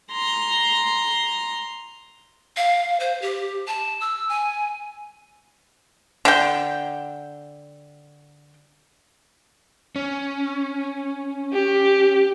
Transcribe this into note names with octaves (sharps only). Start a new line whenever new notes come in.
A#5 C6
F5
C5
G4
A5
E6
G#5
D3 G5
C#4
G4